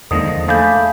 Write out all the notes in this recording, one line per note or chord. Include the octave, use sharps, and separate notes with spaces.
E2 D3 D#3 F3 G#3 A#3 D#6 A#6
A3 D4 G#4 D5 F5 B5 G6